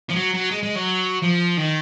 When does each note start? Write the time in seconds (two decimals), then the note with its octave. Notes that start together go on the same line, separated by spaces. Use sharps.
0.10 F3
0.16 F#3
0.34 F#3
0.51 G#3
0.63 G#3
0.76 F#3
1.23 F3
1.58 D#3